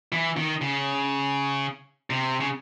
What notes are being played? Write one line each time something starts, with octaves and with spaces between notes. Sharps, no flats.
E3
D#3
C#3
C3
C#3